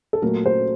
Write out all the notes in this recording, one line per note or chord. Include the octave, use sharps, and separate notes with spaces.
A4
A#2 F#3 A3 A#4
C5